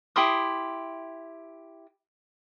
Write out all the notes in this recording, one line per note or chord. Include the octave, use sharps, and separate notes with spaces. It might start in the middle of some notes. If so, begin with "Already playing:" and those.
E4 G4 C6 D#6